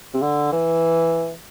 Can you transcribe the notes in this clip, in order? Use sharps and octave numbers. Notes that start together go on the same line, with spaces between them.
C3
D3
E3